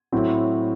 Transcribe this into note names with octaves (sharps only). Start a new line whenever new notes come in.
A2 F#3 C4 E4